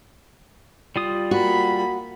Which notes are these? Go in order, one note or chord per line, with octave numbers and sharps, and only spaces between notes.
G3 F4 D#6
A#3 F#4 B5